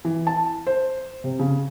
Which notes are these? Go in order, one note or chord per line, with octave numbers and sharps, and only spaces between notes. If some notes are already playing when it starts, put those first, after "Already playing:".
E3
A5
C5
C3
C#3